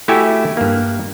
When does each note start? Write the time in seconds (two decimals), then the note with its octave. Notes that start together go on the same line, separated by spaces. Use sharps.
0.08 A3 E4 F#4 G4 E5 G#5
0.57 G2 A#3